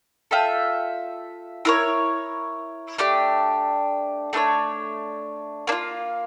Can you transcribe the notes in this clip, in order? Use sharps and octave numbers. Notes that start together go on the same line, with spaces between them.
F4 A4 E5 G5
E4 A#4 C#5
A3 D4 G4
A3 D4 A4 C#5
A#3 D4 F4